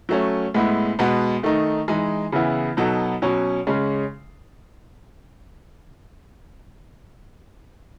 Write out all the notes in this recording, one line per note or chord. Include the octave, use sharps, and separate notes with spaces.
F#3 A3 C#4
A2 G#3 B3 E4
B2 G#3 B3
D#3 A3 D#4
E3 G#3 D#4
C#3 E3 B3 E4
B2 F#3 B3 D#4 A4
B2 F#3 C#4
C#3 G#3 C#4